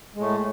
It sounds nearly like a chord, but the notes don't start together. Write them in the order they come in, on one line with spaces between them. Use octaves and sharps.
G#3 A2 A3